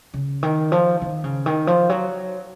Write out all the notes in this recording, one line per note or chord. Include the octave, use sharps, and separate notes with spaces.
C#3
D#3
F3
D#3
C#3
D#3
F3
F#3